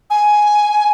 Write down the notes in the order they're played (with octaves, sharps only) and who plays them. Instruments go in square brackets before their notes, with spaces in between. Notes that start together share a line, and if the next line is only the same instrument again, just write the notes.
[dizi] G#5